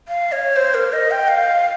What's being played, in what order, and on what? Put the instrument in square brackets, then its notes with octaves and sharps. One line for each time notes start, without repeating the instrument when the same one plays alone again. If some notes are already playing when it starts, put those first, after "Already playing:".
[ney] F5
C#5
C5
A#4
D#5
G5
F5